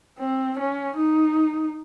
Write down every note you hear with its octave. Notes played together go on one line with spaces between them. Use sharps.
C4
C#4
D#4